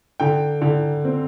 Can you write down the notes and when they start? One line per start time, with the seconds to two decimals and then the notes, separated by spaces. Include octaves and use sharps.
0.20 D3 G5
0.62 D3
1.05 C4